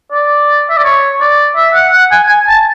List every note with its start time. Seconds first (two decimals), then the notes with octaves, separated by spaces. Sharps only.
0.12 D5
0.70 E5
0.77 D5
0.84 C#5
1.20 D5
1.56 E5
1.74 F#5
1.93 F#5
2.11 G#5
2.29 G#5
2.47 A5